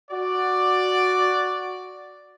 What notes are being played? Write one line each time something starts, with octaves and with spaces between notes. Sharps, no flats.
F#4 D5